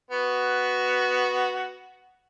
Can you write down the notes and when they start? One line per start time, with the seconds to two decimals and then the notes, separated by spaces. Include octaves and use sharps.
0.11 B3 F#4